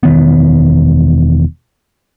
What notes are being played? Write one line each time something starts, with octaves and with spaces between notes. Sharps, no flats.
E1 D#3 B3